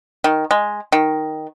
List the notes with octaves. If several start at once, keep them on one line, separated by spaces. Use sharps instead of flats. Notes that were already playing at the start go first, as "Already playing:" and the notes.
D#3
G#3
D#3